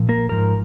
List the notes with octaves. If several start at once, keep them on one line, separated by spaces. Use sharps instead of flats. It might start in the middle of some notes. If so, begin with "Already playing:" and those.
Already playing: A#2 F3
A#3 A#4
G#2 F3 A#4